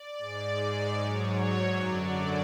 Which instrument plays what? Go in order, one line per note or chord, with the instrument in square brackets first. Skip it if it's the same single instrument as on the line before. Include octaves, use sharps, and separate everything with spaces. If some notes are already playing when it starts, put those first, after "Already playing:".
Already playing: [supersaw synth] D5
G#2 G#3
G#2 F#3 C#5
F#2 D3 F#3 D5